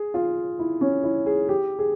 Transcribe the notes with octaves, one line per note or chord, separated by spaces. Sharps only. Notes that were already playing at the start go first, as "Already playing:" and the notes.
Already playing: G#4
F4
E4
C#4
E4
G#4
G4
G#4